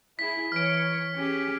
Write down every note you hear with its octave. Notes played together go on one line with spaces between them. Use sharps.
E4 G#4 B6
E3 C#5 F6 D7
C#4 G4 G#4